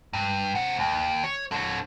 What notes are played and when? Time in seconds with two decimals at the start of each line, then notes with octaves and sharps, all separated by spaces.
0.13 G2
0.55 C3 F#5
0.79 D#2
1.24 C#5
1.52 D3 C#5